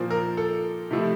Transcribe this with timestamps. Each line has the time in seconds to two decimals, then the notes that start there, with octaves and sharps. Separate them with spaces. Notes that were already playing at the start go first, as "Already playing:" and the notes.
Already playing: A#2 F3 A#3 C5
0.10 A#4
0.37 A4
0.91 C3 F3 A3 E4